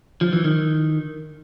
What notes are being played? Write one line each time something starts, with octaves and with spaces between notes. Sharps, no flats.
F3
E3
D#3